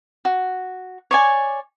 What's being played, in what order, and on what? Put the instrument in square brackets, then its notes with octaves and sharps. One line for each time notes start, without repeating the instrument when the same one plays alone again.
[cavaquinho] F#4
C#5 D5 G#5